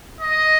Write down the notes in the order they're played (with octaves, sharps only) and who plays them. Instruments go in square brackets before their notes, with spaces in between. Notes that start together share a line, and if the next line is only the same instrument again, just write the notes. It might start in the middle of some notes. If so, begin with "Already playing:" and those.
[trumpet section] D#5